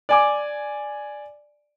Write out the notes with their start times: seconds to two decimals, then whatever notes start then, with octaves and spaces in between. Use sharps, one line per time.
0.09 D5 G#5 D6